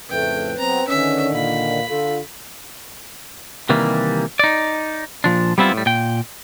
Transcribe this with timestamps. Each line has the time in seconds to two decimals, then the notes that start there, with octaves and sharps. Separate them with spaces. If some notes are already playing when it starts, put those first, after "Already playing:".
0.10 F2 A2 C#3 A3 B4 G5
0.58 F#3 B3 C4 A#5
0.88 D3 D#3 C#4 E5
1.33 A#2 F5 B5
1.89 D3 F4 A4
3.69 C3 D#3 E3 G3 A#3
4.39 D#4 D5
5.24 A#2 F3 D4
5.58 G3 B3 C4 E4 F4
5.73 A2 G3
5.86 A#2 G5